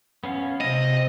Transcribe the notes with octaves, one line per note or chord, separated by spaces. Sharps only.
B3 C#4 F5
C3 C4 D#5